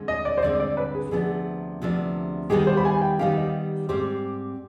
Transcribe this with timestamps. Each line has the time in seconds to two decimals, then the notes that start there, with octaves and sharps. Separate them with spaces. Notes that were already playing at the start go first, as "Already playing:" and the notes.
Already playing: G2 D3 G#3 C4
0.08 D#5
0.25 D5
0.37 C5
0.42 G2 D3 G#3 C4 D5
0.60 D5
0.77 B4
0.95 G#4
1.11 D2 C3 F3 B3 D4 G#4
1.82 D2 C3 F3 B3 D4
2.50 D#3 G3 B3 D#4 G4 G#4
2.67 C5
2.77 B5
2.85 G#5
3.02 G5
3.19 D#3 G3 B3 D#4 G4 F5
3.37 D#5
3.89 G#2 G3 C4 G4 C5 D6